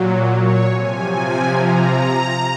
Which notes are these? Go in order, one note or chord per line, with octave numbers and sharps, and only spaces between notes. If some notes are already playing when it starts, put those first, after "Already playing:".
Already playing: A#2 F#3
C#5
C3 F3 G#5
G#5
A#5